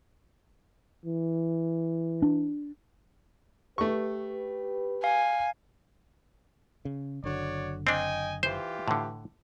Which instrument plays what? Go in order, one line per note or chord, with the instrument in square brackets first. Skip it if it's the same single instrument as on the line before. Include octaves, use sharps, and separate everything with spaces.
[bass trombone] E3
[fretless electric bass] D4
[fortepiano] A3 C#6 [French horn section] G4 B4
[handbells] F5 [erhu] G#5
[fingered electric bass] C#3
[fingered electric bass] F#1 D3 [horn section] F#4 C#5 D5
[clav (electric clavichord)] C4 D4 [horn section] D#5 G5 G#5
[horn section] E3 F4 G4 [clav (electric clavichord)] C5
[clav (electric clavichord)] A2 D3